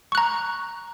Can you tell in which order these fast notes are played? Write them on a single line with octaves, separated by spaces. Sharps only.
C#6 F#6 A#5